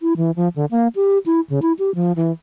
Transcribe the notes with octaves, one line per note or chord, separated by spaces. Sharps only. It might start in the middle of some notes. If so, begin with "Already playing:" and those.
E4
E3
F3
D3
A#3
G4
E4
C#3
E4
G4
F3
E3